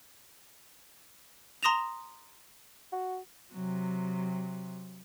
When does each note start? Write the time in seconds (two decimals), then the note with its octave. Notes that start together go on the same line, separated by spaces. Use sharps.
1.63 A#5 C6 D#6 A#6 E7 F7
2.92 F#4
3.52 C3 F#3